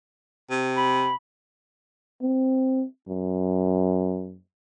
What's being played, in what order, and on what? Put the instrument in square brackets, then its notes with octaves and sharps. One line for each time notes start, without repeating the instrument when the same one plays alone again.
[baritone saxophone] C3
[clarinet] B5
[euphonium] C4
F#2